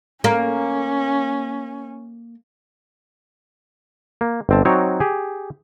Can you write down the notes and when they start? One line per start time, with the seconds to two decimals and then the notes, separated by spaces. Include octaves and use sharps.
0.24 A#3 C#4
4.21 A#3
4.49 G1 C4 A5
4.65 F#3 C4 D#4 F#4 C#5 D5
5.00 G4 G#4